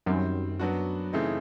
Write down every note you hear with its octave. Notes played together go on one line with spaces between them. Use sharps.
F#2 D#3 G3 C4
F#3 B3 D4 F#4
C#3 E3 A3 C4 D#4